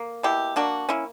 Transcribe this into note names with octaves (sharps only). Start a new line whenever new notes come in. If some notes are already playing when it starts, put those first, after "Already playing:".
Already playing: A#3
B2 E4 G4
A#3 D4 F#4
A#3 C#4 E4